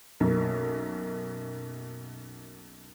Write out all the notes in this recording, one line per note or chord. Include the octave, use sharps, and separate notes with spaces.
B1 F#2 A#3